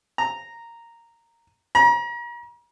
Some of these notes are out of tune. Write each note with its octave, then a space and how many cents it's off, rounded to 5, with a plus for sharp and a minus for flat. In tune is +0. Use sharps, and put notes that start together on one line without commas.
A#5 -5
A#5 +40